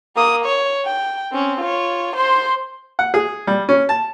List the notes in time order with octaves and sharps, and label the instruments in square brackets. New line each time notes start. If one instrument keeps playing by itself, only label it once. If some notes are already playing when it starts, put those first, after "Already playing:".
[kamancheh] A#3 D#6
C#5
G5
C4 C#4
F4 C#5
C5 C6
[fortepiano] F#5
G#4
G3
C#4
A5